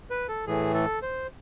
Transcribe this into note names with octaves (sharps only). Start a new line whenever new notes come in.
B4
A4
A2 E3 A3 G#4
A4
C5